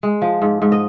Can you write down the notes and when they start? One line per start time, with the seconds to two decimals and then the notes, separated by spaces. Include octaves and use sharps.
0.03 G#3
0.22 F3
0.42 G#2
0.62 G#2
0.72 D#5